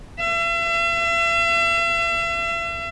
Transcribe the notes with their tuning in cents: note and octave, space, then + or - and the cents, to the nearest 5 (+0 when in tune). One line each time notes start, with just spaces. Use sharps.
E5 +40